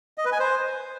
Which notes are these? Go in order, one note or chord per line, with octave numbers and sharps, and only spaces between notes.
D#5
B4
G#5
C5